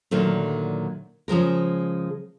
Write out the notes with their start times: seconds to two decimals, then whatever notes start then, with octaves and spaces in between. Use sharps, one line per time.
0.11 A#2 D3 D#3 F#3 A3
1.28 C#3 F3 G#3 A#4